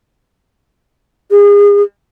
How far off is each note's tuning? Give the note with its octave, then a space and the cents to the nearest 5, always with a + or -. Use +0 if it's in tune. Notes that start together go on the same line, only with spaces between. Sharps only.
G#4 -35